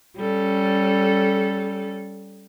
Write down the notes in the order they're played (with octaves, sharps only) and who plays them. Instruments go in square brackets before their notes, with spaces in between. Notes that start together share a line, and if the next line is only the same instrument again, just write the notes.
[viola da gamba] G3 C#4 A4